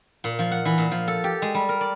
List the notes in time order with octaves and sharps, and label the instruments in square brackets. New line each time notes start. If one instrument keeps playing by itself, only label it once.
[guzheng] A#2
F3
F#5
E3
A#2
F3
A4
G4
G#3
G3
A#4
D5